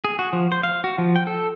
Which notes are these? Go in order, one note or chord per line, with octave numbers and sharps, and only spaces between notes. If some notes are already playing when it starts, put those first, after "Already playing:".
G#4
F#4
F3
C5
F5
F#4
F3
G5
A4